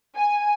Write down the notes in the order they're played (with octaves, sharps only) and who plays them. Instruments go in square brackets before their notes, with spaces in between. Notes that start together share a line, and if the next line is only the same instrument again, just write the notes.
[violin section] G#5